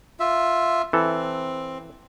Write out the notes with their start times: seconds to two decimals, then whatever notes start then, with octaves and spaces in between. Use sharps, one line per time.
0.20 F4 E5
0.93 E3 C4 A4